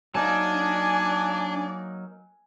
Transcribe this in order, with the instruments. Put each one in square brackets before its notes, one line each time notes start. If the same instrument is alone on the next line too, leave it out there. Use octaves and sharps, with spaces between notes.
[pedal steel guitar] F#3 A#3 D#4 [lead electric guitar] D4 A5 [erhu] D5 [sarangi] G#5